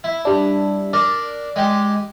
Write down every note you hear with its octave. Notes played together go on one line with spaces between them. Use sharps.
E4
G3 D4
D4 A#4 D5
G#3 G4